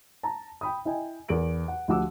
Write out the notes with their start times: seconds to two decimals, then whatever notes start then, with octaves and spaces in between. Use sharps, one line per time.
0.23 A5 A#5
0.61 G5 B5 D#6
0.85 E4 D#5 G5 G#5
1.28 E2 A#4 D7 F#7
1.68 F#5
1.88 D2 F3 G4 F#5 D6 E6